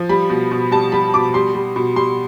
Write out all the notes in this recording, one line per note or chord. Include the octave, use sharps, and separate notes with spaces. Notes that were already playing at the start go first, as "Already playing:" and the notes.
Already playing: F3
G3 B5
B2
B2
G3 A5
G3 B5
B2 D6
G3 C6
G3
B2
G3 C6